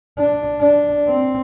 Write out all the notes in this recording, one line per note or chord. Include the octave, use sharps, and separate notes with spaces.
D4
D4
C4